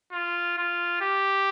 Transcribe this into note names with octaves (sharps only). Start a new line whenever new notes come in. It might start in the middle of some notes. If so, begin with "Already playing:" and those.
F4
F4
G4